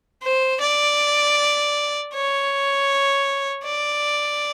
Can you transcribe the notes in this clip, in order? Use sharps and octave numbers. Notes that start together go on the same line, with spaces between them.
C5
D5
C#5
D5